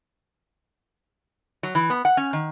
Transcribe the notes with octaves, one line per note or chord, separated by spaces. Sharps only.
F#3
E3
B3
F#5
C#4
D#3